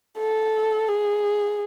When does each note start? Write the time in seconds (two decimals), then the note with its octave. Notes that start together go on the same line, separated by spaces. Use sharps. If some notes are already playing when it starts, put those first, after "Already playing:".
0.18 A4
0.88 G#4